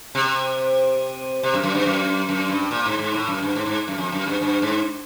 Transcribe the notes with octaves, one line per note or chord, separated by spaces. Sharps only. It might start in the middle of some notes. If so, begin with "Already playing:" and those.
C3
C3
F#2
F#2
G2
F#2
F#2
G2
A#2
G#2
G#2
A2
F#2
G2
G#2
G#2
F#2
F2
F#2
G2
G2
G#2